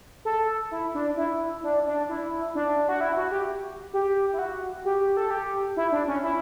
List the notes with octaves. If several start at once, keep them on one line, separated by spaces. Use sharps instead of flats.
A4
E4
D4
E4
D4
D4
E4
D4
F#4
E4
F#4
G4
G4
E4
F#4
G4
A4
G4
E4
D4
C#4
E4